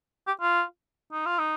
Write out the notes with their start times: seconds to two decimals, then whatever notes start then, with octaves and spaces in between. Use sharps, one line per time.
0.27 G4
0.41 F4
1.13 D#4
1.26 F4
1.39 D#4